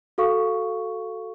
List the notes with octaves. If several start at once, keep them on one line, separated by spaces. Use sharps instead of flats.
F#4 A4 F5 C#6